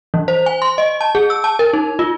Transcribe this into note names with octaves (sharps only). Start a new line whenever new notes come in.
E3
C5
G#5
C6
D#5
A5
G#4
E6
A5
A#4
D#4
F4